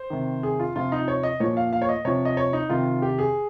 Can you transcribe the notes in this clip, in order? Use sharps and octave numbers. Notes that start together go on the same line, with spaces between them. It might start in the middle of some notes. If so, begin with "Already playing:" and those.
Already playing: C5
C3 D#3
G#4
F4
C3 F3 F4
D#4
C#5
D#5
A#2 F3 C#5
F5
F5
C#5
D#5
C3 F3 C#5
D#5
C#5
D#4
C3 D#3 F4
G4
G#4